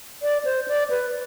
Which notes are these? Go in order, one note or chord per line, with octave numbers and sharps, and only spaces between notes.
D5
C5
D5
B4